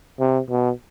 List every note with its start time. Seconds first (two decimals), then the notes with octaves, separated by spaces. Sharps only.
0.19 C3
0.49 B2